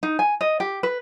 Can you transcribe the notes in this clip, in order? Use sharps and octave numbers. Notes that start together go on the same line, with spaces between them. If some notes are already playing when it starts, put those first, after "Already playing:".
D#4
G#5
D#5
G4
B4